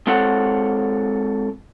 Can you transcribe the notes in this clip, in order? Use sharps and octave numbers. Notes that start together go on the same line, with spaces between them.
G#3 C4 F4 A4 C#5 F#5